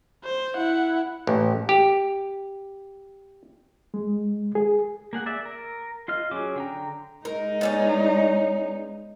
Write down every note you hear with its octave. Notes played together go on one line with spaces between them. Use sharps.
C5
E4 F#5
A1
G4
G#3
G#4
A#3 G#4 F#5
D5 E5
A#4
F4 D#5 F6
F#3 C#4 G#4 D6
D3 G5 A#5
G#3 D#4 A#4
B3 C#4 D5